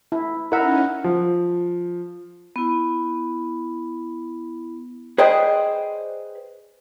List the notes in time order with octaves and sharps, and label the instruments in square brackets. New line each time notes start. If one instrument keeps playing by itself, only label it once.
[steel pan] E4
[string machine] C#4 D#4 [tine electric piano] E4 F#5 [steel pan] A#4 E5
[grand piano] F3
[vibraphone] B3 E4
[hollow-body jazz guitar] G#4 B4 C5 D5 D#5 G5